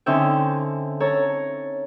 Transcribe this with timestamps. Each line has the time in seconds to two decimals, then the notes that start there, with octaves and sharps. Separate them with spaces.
0.06 D3 C4 C#4 D#4 E5 G5
1.00 A4 C#5 A#5